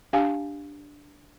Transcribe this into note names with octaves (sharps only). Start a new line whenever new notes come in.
D4 G4 F5 G#5